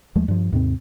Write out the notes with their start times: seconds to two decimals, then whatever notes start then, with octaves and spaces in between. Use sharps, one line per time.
0.15 D#2 F3 G#3 A3
0.28 G2 F3
0.52 D#2 G#2 C3 C4